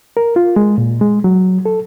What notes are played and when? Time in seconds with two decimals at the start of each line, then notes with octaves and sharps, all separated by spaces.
0.17 A#4
0.36 F4
0.56 G#3
0.78 A#2
1.01 G#3
1.24 F#3
1.66 A4